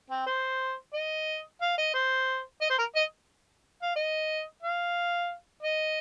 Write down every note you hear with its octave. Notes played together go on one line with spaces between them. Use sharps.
C4
C5
D#5
F5
D#5
C5
D#5
C5
A#4
D#5
F5
D#5
F5
D#5